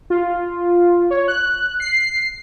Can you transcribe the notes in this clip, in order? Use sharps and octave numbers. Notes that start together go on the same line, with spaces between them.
F4
C#5
F#6
C7